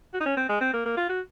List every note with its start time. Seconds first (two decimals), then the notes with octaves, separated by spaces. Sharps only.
0.14 F#4
0.21 D#4
0.26 C#4
0.37 C4
0.49 G#3
0.61 C4
0.74 A#3
0.86 A#3
0.97 F4
1.09 F#4